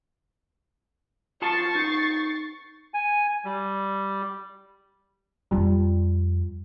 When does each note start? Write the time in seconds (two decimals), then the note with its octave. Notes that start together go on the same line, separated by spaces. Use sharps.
1.42 F4 A5 C#6 A6 C7
1.75 D#4
2.94 G#5
3.45 G3
5.51 F2 G3 F4